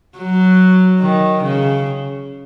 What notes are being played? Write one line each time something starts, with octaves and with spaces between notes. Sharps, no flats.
F#3
D#3
C#3